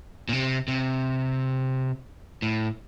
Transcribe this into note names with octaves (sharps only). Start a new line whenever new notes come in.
A#2
C3
C3
A2